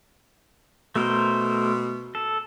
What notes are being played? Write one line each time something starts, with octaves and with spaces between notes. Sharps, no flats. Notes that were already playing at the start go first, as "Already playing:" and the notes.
B2 A3 A#4 C5
A4